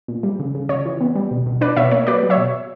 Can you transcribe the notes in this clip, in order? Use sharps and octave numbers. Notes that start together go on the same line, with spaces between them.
A#2
G3
C#3
C#3
C#3 C#5
E3
B3
G3
B2
B2
D4 B4 D5
B2 C#5 E5
A#3 C#5
F#3 B4 D5
F#3
C#5 E5
B2